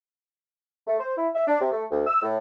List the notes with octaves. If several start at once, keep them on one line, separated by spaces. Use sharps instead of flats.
A3
C5
E4
E5
D4
C3
A3
D2
E6
A2